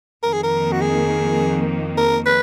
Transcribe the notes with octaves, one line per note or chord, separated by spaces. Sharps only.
F2 D#3 A#3 A#4
G#4
A#4
F#4
G#4
A#4
B4